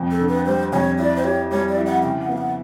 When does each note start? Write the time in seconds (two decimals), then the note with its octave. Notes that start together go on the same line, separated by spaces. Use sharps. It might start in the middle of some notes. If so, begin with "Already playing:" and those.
Already playing: F2
0.11 A4
0.20 D3
0.29 B4
0.46 G3 C5
0.73 F2 C#5
0.98 E4 D5
1.16 C5
1.24 G4 C#5
1.51 G3 C#5
1.69 D5
1.77 E4
1.86 F#5
2.03 C#3 G5
2.20 F#5
2.29 B3 F5
2.38 F#5